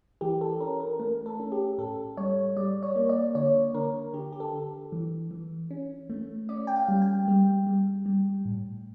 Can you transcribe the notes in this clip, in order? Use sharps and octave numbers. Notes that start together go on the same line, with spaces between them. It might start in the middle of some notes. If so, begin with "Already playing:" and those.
E3 G4
A4
C#4 A#4
A#4
A3 A#4
A4
C#4
G4
A2 A4
G3 C#5
G3 D5
C#5
A#3
D5
D3 C#5
D3 A#4
D3 G4
G4
A4
D3
E3
E3
C#4
A3
C#4 D5
G5
F5
G3
G5
G3
G3
G3
A2